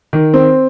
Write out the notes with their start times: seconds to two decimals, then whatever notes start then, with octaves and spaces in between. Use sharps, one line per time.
0.13 D#3
0.34 C4